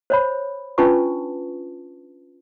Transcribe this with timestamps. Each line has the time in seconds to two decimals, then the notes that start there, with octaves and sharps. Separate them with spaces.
0.10 C5 C#5 B5
0.78 C#4 D4 F4 B4 A5 C#6